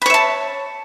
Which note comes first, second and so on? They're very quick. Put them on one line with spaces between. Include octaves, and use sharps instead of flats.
B5 C#5 E5 A5